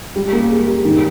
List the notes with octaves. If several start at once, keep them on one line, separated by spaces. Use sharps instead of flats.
G3
A#3
G#4
G3
D#3